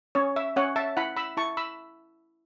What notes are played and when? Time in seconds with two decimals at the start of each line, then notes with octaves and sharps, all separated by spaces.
0.15 C#4 C#5
0.36 E5
0.56 C#4 C#5 F#5
0.76 E5 A5
0.97 E4 F#5 B5
1.16 B5 E6
1.37 E4 A5 C#6
1.57 B5 E6